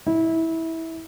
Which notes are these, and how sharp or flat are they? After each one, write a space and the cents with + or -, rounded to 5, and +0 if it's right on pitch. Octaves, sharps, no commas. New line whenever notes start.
E4 -20